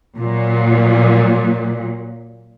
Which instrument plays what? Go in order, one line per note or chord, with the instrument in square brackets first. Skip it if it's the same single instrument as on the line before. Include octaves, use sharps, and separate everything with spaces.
[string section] A#2 F#3